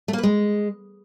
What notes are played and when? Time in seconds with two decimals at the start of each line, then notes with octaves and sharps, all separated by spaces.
0.08 A3
0.13 A#3
0.18 B4
0.23 G#3